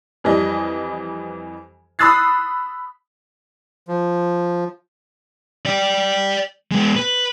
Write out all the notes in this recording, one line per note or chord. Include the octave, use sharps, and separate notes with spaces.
F2 E3 G3 D#5
B5 D#6 E6 F#6 A6 C7
F3
D5 G5
G#3 B3
B4